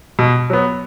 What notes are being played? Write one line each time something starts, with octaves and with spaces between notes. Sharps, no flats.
B2
F#3 B3